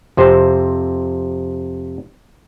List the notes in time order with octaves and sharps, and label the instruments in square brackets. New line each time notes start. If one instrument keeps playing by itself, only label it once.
[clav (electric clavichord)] F2 C3 C5